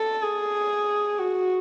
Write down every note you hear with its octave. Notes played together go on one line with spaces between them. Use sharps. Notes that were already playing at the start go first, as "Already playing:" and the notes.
Already playing: A4
G#4
F#4